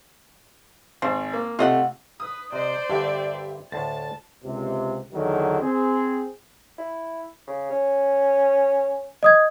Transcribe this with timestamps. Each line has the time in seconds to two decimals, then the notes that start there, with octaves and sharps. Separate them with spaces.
1.02 G#1 C5
1.33 A#3
1.59 C3 A3 F4 D#5 F#5
2.20 B4 D#6
2.52 C3 C5 D5 D#5
2.90 G2 D3 G4 E5 G5
3.72 D2 A2 A5 A6
4.44 C#2 C3
5.13 E2 D3 D#3 F#3
5.61 C4 G#4
6.78 E4
7.48 C#3
7.70 C#4
9.23 D#5 D#6 G#6